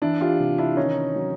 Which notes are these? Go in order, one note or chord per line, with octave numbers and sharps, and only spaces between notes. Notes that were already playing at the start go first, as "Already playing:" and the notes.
E3 D4 E4
F4 G4
C3
D4 E4
D#3 C#4 D#4
F#3